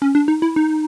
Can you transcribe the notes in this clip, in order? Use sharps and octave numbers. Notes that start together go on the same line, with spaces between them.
C#4
D4
D#4
E4
D#4